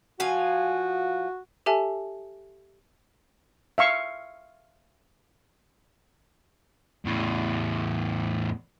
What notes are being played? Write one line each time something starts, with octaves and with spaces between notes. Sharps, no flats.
F3 F#4 F5 G#5
G4 A4 E5 G#5 A5
E5 F5 C#6
E2 A2